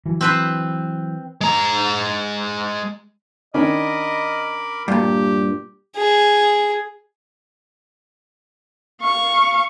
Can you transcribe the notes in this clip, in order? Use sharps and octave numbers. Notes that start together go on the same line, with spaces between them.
E3 F#3
C4 B4 C5
G#3 A#5
D#3 C#4 D4 A#4 D#5 B5 D6
G2 A#2 G4
G#4
F5 C#6